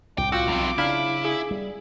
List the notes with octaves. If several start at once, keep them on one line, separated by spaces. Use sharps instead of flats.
C2 A2 G5 D6
F4 F#4 G5 E6
B1 E2 C4
C#3 D4 E4 F5 B5
G#4
G3